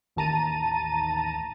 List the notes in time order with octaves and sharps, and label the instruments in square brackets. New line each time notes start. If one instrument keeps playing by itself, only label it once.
[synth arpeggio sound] A1 D#2 A5 A#5 D#7